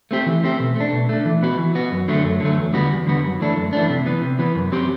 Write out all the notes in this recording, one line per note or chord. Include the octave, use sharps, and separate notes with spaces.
A3 C4 G4
E3
A3 C4 G4
B2
A3 D4
B2
A3 D4
E3
B3 F#4
E3
B3 F#4
F#2
D3 F#3 A3
F#2
D3 F#3 A3
E2
D3 G3 B3 F#4
E2
D3 G3 B3 F#4
F#2
E3 A3 D4
F#2
E3 A3 D4
C3
E3 B3
C3
E3 B3
F#2
F#3 C4 G4